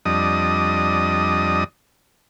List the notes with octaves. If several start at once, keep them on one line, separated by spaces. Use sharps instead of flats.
F2 G3 D4 D#5 D#6